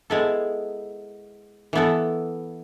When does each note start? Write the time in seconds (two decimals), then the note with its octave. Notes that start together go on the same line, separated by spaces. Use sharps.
0.10 G#3 B3 E4 A4
1.73 E3 B3 E4 A4